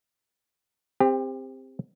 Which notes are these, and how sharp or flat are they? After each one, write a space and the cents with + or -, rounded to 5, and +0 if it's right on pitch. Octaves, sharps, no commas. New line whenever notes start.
C4 +0 G4 +30